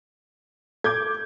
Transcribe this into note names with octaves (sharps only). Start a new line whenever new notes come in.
A4 D6 G6 G#6